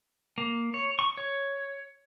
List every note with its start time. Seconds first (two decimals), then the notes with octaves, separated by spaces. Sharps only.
0.38 A#3
0.74 C#5
0.99 C#6
1.17 C#5